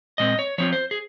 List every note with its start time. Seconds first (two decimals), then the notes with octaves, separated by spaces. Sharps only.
0.18 A#2 G#3 C4 D#5
0.39 C#5
0.58 F3 C4 F4 C#5
0.73 C5
0.91 G#4